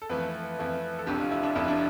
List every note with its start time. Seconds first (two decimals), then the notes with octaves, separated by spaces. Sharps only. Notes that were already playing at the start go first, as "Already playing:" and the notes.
0.02 A4
0.09 F2 E3 A3 B4
0.59 F2 E3 A3
0.99 A4
1.06 F1 F2 D3 G4
1.19 F4
1.31 E4
1.43 D4
1.55 F1 F2 D3 E4
1.68 D4